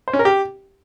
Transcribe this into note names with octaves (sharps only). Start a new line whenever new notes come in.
C5
C#4
A#4
G4